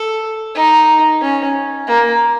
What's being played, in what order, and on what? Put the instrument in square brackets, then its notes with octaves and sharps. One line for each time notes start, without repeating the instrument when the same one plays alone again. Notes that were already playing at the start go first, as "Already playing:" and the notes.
Already playing: [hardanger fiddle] A4
D#4
C#4
A#3